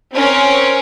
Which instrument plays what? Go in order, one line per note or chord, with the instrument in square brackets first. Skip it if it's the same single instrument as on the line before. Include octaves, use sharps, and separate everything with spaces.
[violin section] C4 C#4 A#4